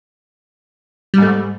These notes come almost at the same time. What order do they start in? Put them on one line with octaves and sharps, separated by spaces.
G3 G#2 A3